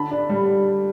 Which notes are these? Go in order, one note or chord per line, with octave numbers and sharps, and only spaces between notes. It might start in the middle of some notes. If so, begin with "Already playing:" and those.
Already playing: D3 A5 B5
D4
G3